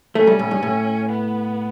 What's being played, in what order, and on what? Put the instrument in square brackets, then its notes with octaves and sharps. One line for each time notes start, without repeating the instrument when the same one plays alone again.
[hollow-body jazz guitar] A3 [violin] C#4
[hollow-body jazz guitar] G3
A2
G2
A2
[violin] B3